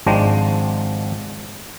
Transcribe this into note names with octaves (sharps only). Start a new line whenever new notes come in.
G#1 F3 G#3 D4 G5 A#5